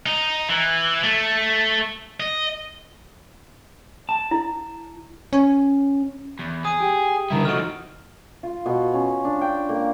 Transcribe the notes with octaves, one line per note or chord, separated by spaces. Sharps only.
D#4
E3
A3
D#5
A5
E4
C#4
E2
G#4 D#6 D#7
G4
G2 D3 E3 E4 A#4
F3 A3 D#4 F#4 F6 D7
F4
B2
C#4
D4
G5
A#3